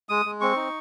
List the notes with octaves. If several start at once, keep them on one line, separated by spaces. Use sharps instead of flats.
G#3 D#6
G#3
C4 C#6
D#4